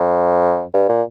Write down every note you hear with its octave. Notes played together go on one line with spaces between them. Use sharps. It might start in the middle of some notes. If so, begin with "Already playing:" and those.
Already playing: F2
G2
A#2